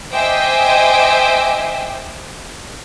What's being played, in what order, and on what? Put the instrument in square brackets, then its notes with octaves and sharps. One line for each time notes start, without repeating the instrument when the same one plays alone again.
[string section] C5 D#5 E5 G5 G#5 D6